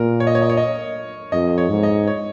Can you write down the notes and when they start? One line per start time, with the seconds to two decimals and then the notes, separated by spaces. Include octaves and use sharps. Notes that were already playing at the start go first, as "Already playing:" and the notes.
Already playing: A#2 A#4
0.20 C#5
0.27 D#5
0.35 C#5
0.42 D#5
0.50 C#5
0.57 D#5
1.32 F2 D#5
1.58 C#5
1.70 G#2
1.83 D#5
2.07 C#5